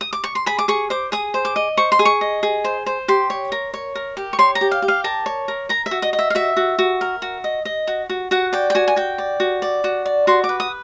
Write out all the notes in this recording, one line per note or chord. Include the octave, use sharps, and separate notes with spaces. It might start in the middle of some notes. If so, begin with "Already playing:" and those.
D#6
D6
C#6
C6
G#4 B5
D6
G#4 C#6
C5 D6
G#4 D#6
C5
D6
D#5
C5 C#6
C6
G#4
C#6
D#5
G#4
C5
C5
G4 C6
C#5
A#4
C#5
A#4
G4
C#6
C#5 C6
A#5
G4
F5
G4
F5
A#4 A5
C#5
A#4
A#4 A#5
E5
F#4
D#5
D#5
E5
F5
F#4 E5
F#4
F#4
A#4
F#4
D#5
D#5
F#4
F#4
F#4 F#5
D5 G5
G5
F#4 G#5
G#5
F#4 G5
D5
F#4
D5
F#4
D5
F#4 C6
D6
B4
D#6